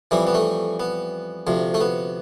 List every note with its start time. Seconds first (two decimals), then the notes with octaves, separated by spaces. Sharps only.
0.11 F2 E3 G3 E4
0.27 B3
0.35 A3
0.80 B3
1.47 D2 C3 F3
1.74 A3
1.81 B3